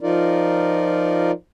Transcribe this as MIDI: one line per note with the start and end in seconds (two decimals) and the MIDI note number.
0.01 1.31 53
0.01 1.31 63
0.01 1.31 65
0.01 1.31 70
0.01 1.31 74